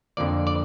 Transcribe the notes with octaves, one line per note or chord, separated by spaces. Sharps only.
F2 D3 F3 A#3 D5
D5